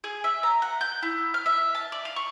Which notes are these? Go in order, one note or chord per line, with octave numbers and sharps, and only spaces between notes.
G#4
E5
A#5
F#5
G6
E4
F6
E5
A5
D5
F5
C#6